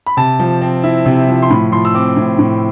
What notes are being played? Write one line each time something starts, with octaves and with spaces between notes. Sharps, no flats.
B5
C3 A5
F3
C4
E4
C3
F3
C6
A2 B5
F3 C6
E6
C4 D6
A2
A2